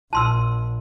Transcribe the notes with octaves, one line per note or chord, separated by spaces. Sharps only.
A#1 A5 C6 E6